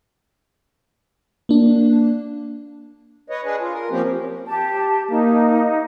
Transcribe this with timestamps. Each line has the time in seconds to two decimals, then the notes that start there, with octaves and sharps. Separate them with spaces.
1.49 A#3 D4
3.30 B4 C#5 D#5
3.45 D4 G#4 B4
3.61 F4
3.73 A#4
3.91 F3 A#3 C4 C#4 G4
4.47 G4 A5
5.11 A#3 D#4